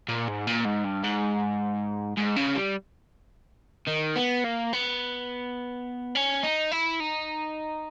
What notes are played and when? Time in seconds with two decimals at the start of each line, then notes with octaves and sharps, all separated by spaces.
0.08 A#2
0.28 G#2
0.47 A#2
0.65 G#2
0.85 G2
1.04 G#2
2.17 G#2
2.36 C#3
2.55 G3
3.88 D#3
4.16 B3
4.44 A#3
4.73 B3
6.15 C#4
6.43 D#4
6.71 E4
7.00 D#4